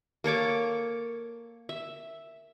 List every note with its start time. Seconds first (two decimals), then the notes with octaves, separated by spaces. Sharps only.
0.24 A#3 A4 C#5 D6
1.69 E5